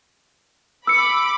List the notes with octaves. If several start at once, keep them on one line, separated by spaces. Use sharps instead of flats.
B5 D6 E6 C#7